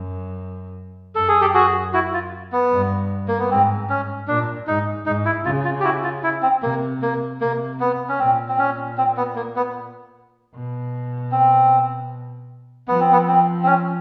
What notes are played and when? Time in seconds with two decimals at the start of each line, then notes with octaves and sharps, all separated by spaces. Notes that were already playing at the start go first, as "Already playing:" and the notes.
Already playing: F#2
1.15 F#2 A4
1.28 G#4
1.41 G4 A4
1.54 F#4 G#4
1.93 E4 F#4
2.14 F4
2.52 B3
2.71 G2
3.28 A#3
3.39 B3
3.50 G#2 C4
3.90 C#4
4.28 A#2 D4
4.67 G#2 D#4
5.06 G#2 D#4
5.25 E4
5.45 C#3 F4
5.65 F4
5.80 G4
5.84 E4 F#4
6.04 F4
6.23 E4
6.42 C4
6.62 C3 A#3
7.02 A#3
7.41 C3 A#3
7.80 B3
8.09 C#4
8.19 A#2 C4
8.49 C4
8.59 C#4
8.98 C4
9.17 B3
9.36 A#3
9.56 B3
10.54 B2
11.32 C4
12.88 F3 B3
13.01 C4
13.13 B3
13.28 C4
13.63 C4
13.66 C#4